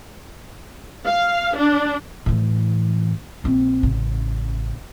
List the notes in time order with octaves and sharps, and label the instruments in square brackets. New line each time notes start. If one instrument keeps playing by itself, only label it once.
[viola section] F5
D4
[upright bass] A2 E3
A#1 C4
A1 C#3